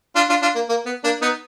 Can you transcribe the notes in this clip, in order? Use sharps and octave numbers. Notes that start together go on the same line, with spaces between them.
D4 F4
D4 F4
D4 F4
A#3
A#3
B3
A#3 D4
B3 D#4